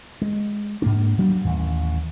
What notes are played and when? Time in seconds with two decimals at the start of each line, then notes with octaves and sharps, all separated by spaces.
0.22 G#3
0.82 G#2 A#3 D4
1.18 D1 F#3 G3 D4
1.45 A1 D#2